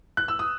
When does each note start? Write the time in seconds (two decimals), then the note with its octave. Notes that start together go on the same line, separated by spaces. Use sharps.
0.17 F#6
0.28 E6
0.39 D#6